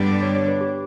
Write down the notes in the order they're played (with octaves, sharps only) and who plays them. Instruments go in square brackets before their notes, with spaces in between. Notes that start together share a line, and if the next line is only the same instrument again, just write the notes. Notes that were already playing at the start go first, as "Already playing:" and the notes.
Already playing: [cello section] G2 D3 G3 B3 D4
[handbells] C#5
C#5
B4
G4